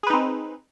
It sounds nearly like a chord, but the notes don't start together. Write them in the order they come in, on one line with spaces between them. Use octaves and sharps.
G#4 B4 D#4 C4